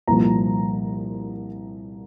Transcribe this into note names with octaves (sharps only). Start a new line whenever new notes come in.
C2 A#2 F3 A#5